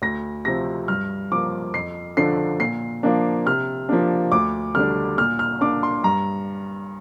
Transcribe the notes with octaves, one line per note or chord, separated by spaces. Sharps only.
D2 A#6
C3 F3 C4 A#6
G2 F6
F3 A#3 D6
F2 C7
D3 F3 D4 C7
A#2 C7
F3 A#3 D4
C3 F6
F3 A#3 D4
D2 D6
D3 G3 D4 F6
A#2 F6
F6
A#3 D4 D6
C6
G2 A#5